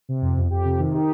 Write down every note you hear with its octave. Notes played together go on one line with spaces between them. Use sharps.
C3
F2
F2
F2 G4
C3
D#3
D#4 G4